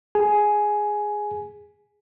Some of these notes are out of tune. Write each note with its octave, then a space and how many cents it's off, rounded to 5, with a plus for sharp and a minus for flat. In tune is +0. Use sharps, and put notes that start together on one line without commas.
G#4 -5 G#5 +10